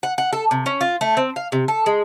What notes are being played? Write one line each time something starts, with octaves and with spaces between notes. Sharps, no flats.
F#5
F#5
A4
C3
C#4
F4
A3
C4
F5
C3
A4
G#3